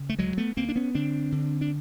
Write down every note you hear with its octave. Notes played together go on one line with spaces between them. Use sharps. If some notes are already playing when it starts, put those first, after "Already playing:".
Already playing: C#3
A3
D2 F#3 G#3
A3 B3
D2 A#3 C4
D4
B3 C#4
D3 C4 D4
D3
D4